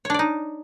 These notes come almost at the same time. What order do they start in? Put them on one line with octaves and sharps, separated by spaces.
C#5 D4 D5 D#4